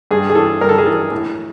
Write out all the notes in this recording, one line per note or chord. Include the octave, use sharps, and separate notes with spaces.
G2 G#4
G#4
E3 A4
G2 A#4
A4
G#4
E3 A4
A2